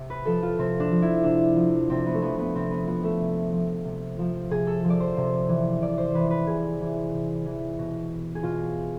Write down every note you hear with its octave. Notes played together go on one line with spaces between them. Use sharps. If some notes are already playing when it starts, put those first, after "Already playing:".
Already playing: C3
B4
F3 A4
F4
C3 C4
D4
F3
E4
C3 D4
F3
C3 C4
B3
A3
F3 B3
B3
C3 C4
B3
F3 B3
A3
C3
F3
C3
F3
C3 G#4
A4
F3
D5
C5
C3
E3
C3 D5
C5
E3 B4
B4
C3 G#4
E3
C3
E3
B2
G#4
B2 F4